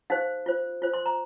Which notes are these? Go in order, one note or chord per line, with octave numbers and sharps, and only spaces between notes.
D#4 G4 C5 F5
F4 C5
F4 C5
C6
A#5